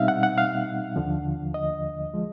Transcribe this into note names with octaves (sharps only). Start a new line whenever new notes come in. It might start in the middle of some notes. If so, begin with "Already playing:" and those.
Already playing: B2 G3 C4 D#4 E5 F5
F#5
F#5
F5
D#2 D3 F3
D#5
F3 G#3